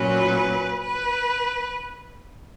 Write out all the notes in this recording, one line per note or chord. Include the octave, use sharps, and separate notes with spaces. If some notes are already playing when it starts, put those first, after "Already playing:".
Already playing: A#2 F#3 C#4 B4
B4